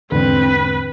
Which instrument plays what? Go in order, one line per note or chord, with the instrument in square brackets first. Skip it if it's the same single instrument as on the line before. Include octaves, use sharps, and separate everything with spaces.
[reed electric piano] E2 G#2 D3 [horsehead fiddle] C4 [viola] B4